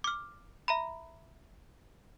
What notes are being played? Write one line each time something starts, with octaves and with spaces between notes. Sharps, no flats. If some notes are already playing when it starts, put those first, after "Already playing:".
D6 F6
E5 A#5 B5